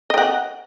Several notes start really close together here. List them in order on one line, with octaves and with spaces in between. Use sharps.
D#5 G5 F#5